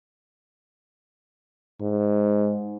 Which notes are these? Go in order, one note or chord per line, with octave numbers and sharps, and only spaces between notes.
G#2